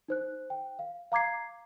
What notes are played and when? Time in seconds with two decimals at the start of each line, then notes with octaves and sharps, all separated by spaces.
0.08 D#4 C5 F#6
0.50 G5
0.79 F5
1.12 F5 A#5 D6 G#6 C7